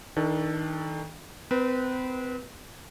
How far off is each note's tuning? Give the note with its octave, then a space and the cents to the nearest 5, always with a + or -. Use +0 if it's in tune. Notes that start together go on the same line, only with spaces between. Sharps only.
D#3 +35 D4 +25 A4 +0
C4 -35 B4 -20